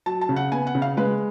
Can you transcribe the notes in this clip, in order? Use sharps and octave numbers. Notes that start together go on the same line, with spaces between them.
F#3 A5
A5
C#3
F#5
B3 G#5
F#5
C#3
F5
G#3 B4